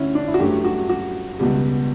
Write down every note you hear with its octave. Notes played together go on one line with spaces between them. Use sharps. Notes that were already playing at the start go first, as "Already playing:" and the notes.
Already playing: D2 D3 C#4 E4
D4
E4
F#4
G2 F#3 A3 G4
F#4
F#4
C#2 B2 G3